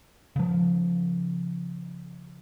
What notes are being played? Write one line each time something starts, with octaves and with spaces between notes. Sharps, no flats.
C#3 F3